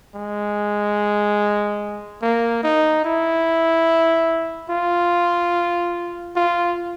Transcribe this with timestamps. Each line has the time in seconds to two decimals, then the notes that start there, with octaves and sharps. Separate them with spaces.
0.15 G#3
2.22 A#3
2.63 D#4
3.05 E4
4.70 F4
6.36 F4